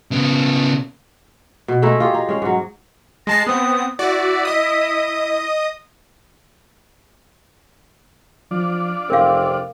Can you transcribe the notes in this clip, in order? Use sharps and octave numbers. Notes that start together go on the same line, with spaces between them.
C#3 B3
B2
G#3 A3 D#4 E4
F4 G4 G#4
D#4
G#3 C#4 F5
G#2 F#3
G#3 A5 A#6 C7
B3 C4 D#6
E4 F#4 D5
D#5 D#6
F3 D4 F4 D5
F1 C4 A#4 F5